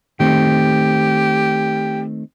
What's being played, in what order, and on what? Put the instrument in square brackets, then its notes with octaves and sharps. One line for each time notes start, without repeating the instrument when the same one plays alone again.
[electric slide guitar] D#3 A3 C4 [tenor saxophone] G4